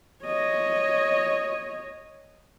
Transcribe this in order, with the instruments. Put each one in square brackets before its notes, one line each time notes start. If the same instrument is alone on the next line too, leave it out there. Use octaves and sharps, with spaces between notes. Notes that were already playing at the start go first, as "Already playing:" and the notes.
[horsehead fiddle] C#5 D#5